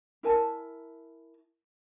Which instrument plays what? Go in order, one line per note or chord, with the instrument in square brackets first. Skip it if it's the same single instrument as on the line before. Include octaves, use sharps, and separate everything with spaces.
[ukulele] E4 A#4 G#5 A5